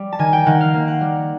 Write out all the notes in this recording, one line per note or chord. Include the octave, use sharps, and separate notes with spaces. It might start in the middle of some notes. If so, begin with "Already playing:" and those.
Already playing: G3
A5
D#3 G#5
G5
D#3 F#5
F5
A#3
F#5
G3